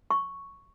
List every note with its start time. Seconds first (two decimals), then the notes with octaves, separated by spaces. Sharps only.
0.11 C#6